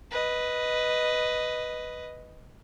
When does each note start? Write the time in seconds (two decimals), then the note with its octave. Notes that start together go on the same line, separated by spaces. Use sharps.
0.11 B4 D#5